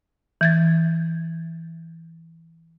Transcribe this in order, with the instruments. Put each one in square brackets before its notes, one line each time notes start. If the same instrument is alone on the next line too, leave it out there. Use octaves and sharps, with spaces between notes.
[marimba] E3 G#6 A6